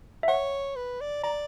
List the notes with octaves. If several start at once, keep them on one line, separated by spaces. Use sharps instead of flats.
E5
C#5 F#5
B4
D5
D5 A#5